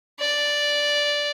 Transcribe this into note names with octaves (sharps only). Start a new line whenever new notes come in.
D5